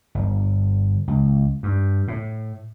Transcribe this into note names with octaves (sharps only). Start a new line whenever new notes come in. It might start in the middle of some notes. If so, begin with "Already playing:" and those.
G1
C#2
G2
A2